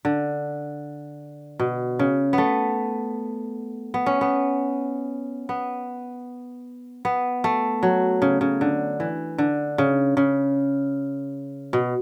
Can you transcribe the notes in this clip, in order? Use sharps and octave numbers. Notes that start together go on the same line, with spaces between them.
D3
B2
C#3
B3
A3
B3
C#4
B3
B3
B3
A3
F#3
C#3
C#3
D3
E3
D3
C#3
C#3
B2